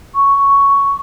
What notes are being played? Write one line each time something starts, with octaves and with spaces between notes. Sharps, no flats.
C#6